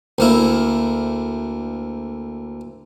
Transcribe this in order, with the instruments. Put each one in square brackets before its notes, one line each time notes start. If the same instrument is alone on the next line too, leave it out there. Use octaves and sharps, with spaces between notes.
[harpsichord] D2 A#3 E4